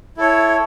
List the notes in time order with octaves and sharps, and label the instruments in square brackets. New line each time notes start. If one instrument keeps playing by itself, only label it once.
[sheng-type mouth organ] E4 A4 C#5